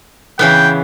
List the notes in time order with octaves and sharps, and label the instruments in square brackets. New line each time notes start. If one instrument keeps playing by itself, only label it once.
[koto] C#3 E3 B3 [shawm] G5